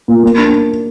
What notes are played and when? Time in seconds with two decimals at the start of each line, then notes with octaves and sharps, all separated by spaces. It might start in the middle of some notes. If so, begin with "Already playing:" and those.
0.08 A#2
0.23 A#3
0.38 D4